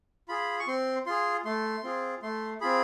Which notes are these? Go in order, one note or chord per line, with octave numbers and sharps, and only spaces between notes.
F4 G#4 B5
C#6
C4 C6
F4 G#4 C6
A3 C6
C4 F4 G#4
A3 C6
C4 F4 G#4 B5